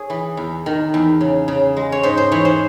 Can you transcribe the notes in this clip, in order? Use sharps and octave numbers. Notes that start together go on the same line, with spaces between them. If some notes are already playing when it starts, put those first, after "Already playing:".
Already playing: G#4 C#5
E3
E2
D#3
E2
C#3
C#3
G#3
C#5
G#2 C5
C5
E3 C#5
C5